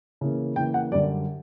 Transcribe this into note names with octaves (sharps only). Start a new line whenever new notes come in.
C#3 E3 A#3
C#3 E3 A#3 G5
F#5
F#2 D3 G3 D5